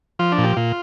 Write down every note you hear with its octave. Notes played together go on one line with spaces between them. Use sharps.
F3 F4
D4
A#2
G4
A#2 F4